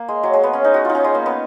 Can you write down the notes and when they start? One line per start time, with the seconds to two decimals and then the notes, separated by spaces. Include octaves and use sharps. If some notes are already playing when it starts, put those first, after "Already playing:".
Already playing: A#3
0.08 G#3
0.23 F#3
0.33 G#3
0.43 B3
0.53 C#4
0.64 D#4
0.74 F#4
0.85 D#4 F4
0.95 C#4
1.04 G#3
1.14 A#3
1.26 B3